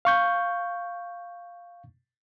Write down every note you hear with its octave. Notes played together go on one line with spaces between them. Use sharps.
F5 C#6 G6